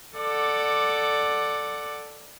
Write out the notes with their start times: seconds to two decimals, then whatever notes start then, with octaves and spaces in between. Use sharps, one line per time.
0.17 A4 D5 F#5 D6